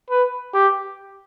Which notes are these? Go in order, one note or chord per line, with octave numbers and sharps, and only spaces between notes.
B4
G4